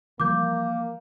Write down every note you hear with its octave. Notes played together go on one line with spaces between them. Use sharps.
E3 F3 G3 A#3 D6 G6